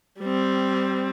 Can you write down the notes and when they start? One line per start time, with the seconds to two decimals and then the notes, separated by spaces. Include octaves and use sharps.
0.20 G3 C4